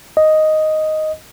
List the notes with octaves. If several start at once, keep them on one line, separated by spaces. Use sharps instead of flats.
D#5